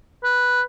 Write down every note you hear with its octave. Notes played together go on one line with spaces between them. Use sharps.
B4